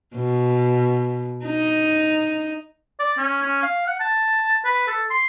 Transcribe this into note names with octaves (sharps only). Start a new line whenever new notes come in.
B2
D#4
D5
C#4
C#4
F5
F#5
A5
B4
A4
C6